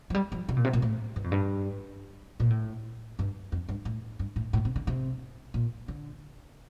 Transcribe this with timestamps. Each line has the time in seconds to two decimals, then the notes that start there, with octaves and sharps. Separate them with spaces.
0.10 F3
0.15 G3
0.32 F3
0.49 C3
0.57 A#2
0.65 C3
0.73 A#2
0.82 A2
1.16 G2
1.24 F2
1.32 G2
2.40 A#2
2.50 A2
3.19 G2
3.52 F2
3.69 G2
3.85 A2
4.19 G2
4.36 A2
4.53 A2
4.65 C3
4.76 D3
4.87 C3
5.54 A#2
5.88 D3